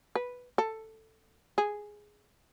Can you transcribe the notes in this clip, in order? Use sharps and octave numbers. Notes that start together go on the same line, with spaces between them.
B4
A4
G#4